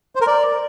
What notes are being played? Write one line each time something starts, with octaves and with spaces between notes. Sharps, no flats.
C5
A#4
D5